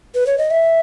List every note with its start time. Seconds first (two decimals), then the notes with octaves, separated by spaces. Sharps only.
0.15 B4
0.27 C#5
0.38 D#5
0.51 E5